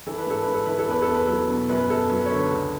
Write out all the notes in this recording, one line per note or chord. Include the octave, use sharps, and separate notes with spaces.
E3 A4
B4
G#2 A4
G#2 B4
A4
E3 B4
A4
E2 B4
A4
E2
B4
F#3 A4
B2
F#2 B4
F#2 A4
F#3 B4
C#5
D3 B4
C#2